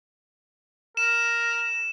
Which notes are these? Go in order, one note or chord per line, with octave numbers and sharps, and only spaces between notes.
A#4 E7